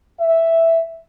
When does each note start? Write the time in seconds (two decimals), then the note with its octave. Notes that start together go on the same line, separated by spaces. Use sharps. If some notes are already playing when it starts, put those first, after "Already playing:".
0.20 E5